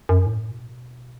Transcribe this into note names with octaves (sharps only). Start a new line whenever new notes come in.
F#2
A2
B2